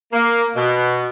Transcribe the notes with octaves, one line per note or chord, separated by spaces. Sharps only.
A#3
B2